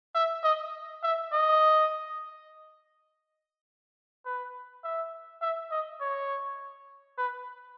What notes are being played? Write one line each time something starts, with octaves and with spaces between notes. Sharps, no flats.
E5
D#5
E5
D#5
B4
E5
E5
D#5
C#5
B4